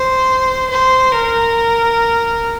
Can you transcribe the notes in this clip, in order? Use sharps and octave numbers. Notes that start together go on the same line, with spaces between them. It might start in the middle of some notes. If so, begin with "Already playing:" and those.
Already playing: C5
C5
A#4